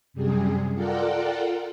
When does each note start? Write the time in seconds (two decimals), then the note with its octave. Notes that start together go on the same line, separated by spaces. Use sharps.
0.13 F#2 C3 G3 G#4
0.75 F4 A4 A#4 D5 F#5 G5